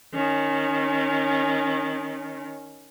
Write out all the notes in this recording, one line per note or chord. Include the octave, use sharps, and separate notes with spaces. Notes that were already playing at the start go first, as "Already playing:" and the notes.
D#3 C#4